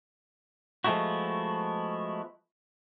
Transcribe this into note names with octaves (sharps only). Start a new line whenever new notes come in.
F3 G#3 A3 B3 E4 F#4